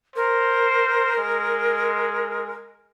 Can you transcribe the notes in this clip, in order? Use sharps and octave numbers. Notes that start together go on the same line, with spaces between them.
A#4 C5
G#3